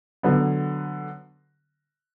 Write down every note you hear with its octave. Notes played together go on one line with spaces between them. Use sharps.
D3 F#3 B3